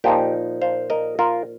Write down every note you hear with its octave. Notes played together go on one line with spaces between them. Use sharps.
A#2 F3 A#3 D#4 G4
C5 F5
A#4 D#5
F4 A#4